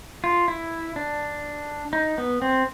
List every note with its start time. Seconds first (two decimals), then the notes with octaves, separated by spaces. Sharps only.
0.24 F4
0.48 E4
0.96 D4
1.93 D#4
2.18 B3
2.42 C4